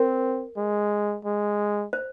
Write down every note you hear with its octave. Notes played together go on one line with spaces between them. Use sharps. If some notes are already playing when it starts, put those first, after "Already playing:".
Already playing: C4 A#4
G#3
G#3
C5